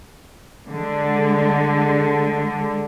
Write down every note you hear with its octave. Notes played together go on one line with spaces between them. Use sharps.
D3 G#3